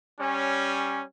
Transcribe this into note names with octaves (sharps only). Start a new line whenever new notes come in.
G3 C#4